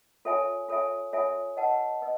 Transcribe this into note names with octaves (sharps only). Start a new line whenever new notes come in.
F4 A4 C#5 E5 G#5
F4 A4 C#5 E5 G#5
F4 A4 C#5 E5 G#5
B4 D#5 F#5 A5
B4 D#5